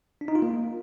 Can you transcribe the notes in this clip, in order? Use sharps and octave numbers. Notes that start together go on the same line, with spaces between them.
D4
D#4
F4
A#3